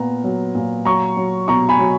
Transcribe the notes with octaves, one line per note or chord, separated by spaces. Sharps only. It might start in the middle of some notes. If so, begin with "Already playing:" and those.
Already playing: A#2 B3 A#5
F#3
A#2
F#3 A#5 C#6
F#3
B2 A#5 C#6
G#5 B5
F#3